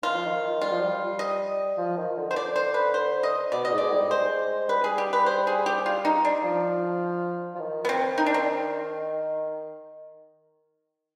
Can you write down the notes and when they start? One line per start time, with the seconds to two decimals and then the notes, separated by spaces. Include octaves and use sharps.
0.03 D#3 F4
0.14 F3
0.26 D#3
0.61 G3 F4
0.72 F3
0.82 G3
1.19 D#5
1.77 F3
1.97 D#3
2.17 D3
2.31 C5
2.36 D5
2.56 C5
2.74 B4
2.94 C5
3.23 D#5
3.52 B2 D5
3.65 B2 D#5
3.72 G#2
3.78 D5
3.92 G3
4.10 G#3 C5
4.68 G3 B4
4.84 G#4
4.98 G4
5.13 B4
5.26 C5
5.47 G#4
5.66 G4
5.86 F4
6.05 D#4
6.25 D4
6.43 F3
7.55 F3
7.59 D#3
7.85 B3
7.89 C4
8.18 D#4
8.26 D4
8.34 C4